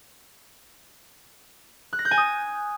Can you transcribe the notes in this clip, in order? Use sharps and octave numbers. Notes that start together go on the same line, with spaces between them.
F#6
A#6
G6
G#5
D#6